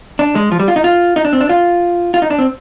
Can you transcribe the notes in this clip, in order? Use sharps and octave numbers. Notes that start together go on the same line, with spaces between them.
D4
G#3
F3
G3
F4
D#4
F4
D#4
D4
C4
D4
F4
F4
D#4
D4
C4